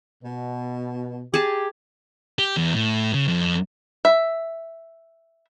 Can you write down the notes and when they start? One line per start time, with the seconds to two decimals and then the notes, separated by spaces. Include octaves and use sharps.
0.24 B2
1.34 G4 G#4 A5
2.39 G4
2.57 E2
2.73 A2
3.14 C#3
3.28 F2
4.05 E5